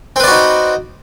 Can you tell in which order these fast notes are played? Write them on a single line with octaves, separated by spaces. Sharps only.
C4 B4 D5 F#4 D#4